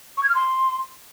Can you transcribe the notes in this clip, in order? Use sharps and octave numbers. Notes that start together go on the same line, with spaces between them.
C#6
G#6
F6
C6